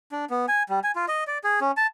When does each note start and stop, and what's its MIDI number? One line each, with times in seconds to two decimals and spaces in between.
0.12 0.25 62
0.30 0.46 59
0.48 0.63 80
0.69 0.80 55
0.84 0.92 80
0.96 1.06 65
1.08 1.24 75
1.27 1.38 74
1.44 1.60 68
1.61 1.71 61
1.77 1.87 81